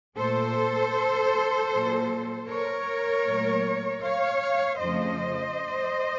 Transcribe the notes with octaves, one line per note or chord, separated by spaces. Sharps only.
A#2 A3 A4 C5
A#2 F#3 A#3
A#4 C#5
A#2 F#3 A3
C#5 F5
F2 C#3 F3 A3 C5 D#5